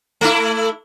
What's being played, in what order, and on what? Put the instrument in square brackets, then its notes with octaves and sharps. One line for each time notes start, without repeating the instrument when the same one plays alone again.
[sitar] A3 E4